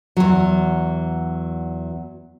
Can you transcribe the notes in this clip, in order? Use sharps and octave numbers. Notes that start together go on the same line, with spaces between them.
E2 F#3